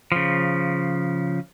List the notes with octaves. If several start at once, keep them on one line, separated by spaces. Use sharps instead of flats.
C#3 F3